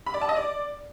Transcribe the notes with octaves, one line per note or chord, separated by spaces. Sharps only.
B5
D5
A5
D#5
D5